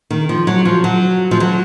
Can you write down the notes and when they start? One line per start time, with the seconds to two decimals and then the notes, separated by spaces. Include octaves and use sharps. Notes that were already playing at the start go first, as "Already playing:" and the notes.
0.10 D#3
0.29 F3
0.47 F#3
0.65 F3
0.84 F#3
1.31 F3
1.40 F#3